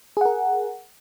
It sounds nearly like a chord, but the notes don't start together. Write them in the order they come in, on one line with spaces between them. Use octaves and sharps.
G#4 F#5 A#4